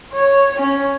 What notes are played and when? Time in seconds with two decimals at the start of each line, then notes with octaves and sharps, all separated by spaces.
0.13 C#5
0.52 C#4 C#5